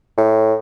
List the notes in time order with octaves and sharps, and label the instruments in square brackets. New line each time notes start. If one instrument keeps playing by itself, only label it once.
[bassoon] A2